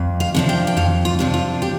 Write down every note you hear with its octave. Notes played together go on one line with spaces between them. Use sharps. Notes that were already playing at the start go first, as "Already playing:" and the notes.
Already playing: F2
F5
C3 F3 D4
G5
G5
F2 F5
F4
C3 F3 D4
F4
G4